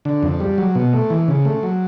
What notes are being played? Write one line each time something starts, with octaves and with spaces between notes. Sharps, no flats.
D3
F2
G3
F#3
B2
A3
E3
C#3
A3
F#3